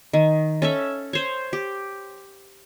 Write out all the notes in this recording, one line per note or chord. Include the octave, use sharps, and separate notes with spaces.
D#3
C#4 A4 E5
C5 C#5
G4